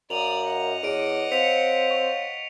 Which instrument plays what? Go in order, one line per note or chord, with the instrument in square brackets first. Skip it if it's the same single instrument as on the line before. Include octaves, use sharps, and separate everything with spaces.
[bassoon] F#2 [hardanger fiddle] D5 D#6 [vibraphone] F5 A#5 [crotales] F7 F#7
[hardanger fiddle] D#5 F#5
[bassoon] E2 [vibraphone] C#5 D6 [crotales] D7 D#7
[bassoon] C4 [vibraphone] C#5 F5 [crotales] B6 C#7 F7
[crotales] C#6